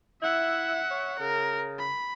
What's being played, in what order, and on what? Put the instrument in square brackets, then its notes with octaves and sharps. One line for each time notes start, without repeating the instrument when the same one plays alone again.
[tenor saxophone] E4 [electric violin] E5 F#5
[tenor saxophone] C#5
[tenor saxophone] C#3 [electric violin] A#4
[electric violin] B5